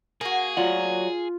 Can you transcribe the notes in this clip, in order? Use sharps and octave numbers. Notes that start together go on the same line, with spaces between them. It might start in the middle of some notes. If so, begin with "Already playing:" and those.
A#3 F#4 G#4
F#3 F4 D5 F#5